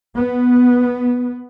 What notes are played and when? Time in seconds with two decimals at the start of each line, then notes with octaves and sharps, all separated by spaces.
0.16 B3